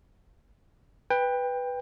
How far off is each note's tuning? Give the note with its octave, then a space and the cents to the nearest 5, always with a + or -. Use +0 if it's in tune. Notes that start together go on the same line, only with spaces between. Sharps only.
B4 +0 G5 +20